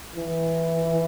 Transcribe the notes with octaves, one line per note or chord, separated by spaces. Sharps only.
E3